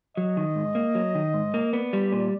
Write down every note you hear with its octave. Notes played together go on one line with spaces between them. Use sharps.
F#3 D#5
D#3
G#2
A#3
F#3
D#3
G#2
A#3
B3 D5
G3
A#2